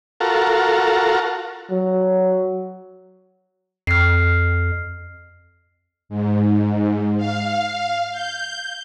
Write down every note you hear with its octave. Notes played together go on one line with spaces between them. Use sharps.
F4 F#4 A4 A#4
F#3
F2 F6 C7
G#2
F5
G6